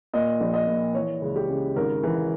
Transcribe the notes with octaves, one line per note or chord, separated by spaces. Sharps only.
A#2 D#5
A#1
D#5
A#2
E3 C#5
C#2
G4
C#3
G#1 A#4
E3 A#4